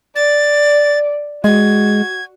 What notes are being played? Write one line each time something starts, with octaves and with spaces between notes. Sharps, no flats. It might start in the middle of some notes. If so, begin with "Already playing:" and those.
D5 A6
G#3 F#4 G#6